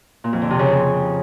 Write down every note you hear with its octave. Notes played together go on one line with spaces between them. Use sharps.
A#2
F2
D3
C3
C#3